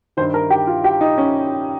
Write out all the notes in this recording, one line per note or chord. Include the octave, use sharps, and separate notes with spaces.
G2 D#3 C5
A#4
G4
F4
G4
D#4
C#4